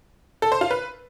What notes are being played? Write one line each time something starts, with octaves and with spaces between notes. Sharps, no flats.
A4
C5
F4
B4